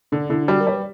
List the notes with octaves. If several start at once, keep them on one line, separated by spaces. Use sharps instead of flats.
D3 D4
D3 E4
G3 F#4
A#4
G3 C#5
B4